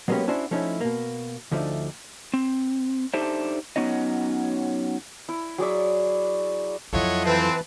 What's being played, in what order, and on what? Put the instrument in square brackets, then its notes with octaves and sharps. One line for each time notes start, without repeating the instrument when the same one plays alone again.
[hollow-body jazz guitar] F#3 G#3 A#3 B3 C#4 G4
C#4 D4 E4 F#4 C5
F3 A3 C#4 D#4 E4
B2 A#3
D2 D3 F3 A3 D#4
[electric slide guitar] C4
D4 D#4 G4 A4 C5 E5
F#3 B3 C#4 D#4 D#5
[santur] E4
F#3 G#4 D5 E5
[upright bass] F2 F#3 [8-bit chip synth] E4 F4 A4 [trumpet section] C#5 D#5 F#5
[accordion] E3 B4 A5 [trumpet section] C4